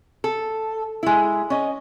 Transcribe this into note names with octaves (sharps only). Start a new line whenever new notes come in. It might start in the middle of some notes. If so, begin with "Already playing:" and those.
A4
G#3 E4
C#4 D#5